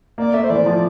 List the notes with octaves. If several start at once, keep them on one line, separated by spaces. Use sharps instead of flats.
A#3 D5
A3 E5
C5
E3 D5
F3